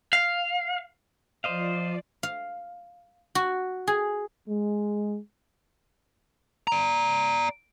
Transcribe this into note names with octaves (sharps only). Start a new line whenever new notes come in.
F5
F3 C5 D5 D#5 F5
F5
F#4
G#4
G#3
D5 A#5